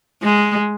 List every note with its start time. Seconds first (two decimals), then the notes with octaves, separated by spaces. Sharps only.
0.22 G#3